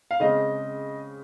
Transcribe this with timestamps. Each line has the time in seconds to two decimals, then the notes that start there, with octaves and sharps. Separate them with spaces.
0.11 F5
0.20 C#3 G#3 C4 D#5